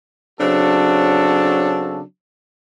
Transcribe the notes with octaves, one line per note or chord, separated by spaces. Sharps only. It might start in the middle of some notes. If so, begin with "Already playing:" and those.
C#3 F#3 C4 D4 F#4 A4